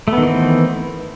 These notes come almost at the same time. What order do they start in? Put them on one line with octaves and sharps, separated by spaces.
A3 B3 D#3 E3 C4